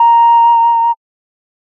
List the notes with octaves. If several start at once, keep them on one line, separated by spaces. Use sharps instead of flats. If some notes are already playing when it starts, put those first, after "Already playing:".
Already playing: A#5